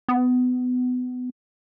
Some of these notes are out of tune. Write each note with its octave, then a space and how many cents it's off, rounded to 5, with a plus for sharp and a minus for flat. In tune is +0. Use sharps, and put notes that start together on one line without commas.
B3 +25